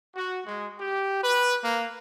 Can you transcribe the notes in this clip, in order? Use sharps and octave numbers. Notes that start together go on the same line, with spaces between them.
F#4
G#3
G4
B4
A#3